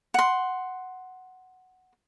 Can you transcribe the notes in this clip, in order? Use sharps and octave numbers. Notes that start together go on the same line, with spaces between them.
F#5 C6